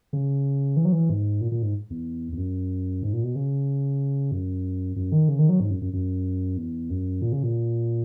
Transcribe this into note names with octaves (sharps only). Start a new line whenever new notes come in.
C#3
E3
F#3
E3
G#2
A#2
A#2
G#2
E2
E2
F#2
G#2
A#2
B2
C#3
F#2
F#2
D#3
C#3
D#3
F#3
G#2
F#2
F#2
F#2
E2
F#2
A#2
C#3
A#2